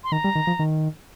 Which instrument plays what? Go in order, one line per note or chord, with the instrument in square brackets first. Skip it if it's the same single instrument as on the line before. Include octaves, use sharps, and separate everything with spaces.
[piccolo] C6
[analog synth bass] D#3 [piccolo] A#5
[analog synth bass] G3
D#3
F3
D#3